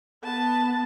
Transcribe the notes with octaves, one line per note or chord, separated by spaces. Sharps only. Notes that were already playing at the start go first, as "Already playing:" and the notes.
B3 A5